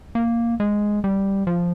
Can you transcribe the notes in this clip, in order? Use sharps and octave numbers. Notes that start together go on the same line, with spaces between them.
A#3
G#3
G3
F3